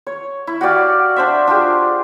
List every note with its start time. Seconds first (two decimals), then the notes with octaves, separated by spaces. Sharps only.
0.07 C#5
0.47 E4
0.61 F#4 G4 D5 F5
1.16 D4 C5 E5
1.47 D4 F4 G4 G#4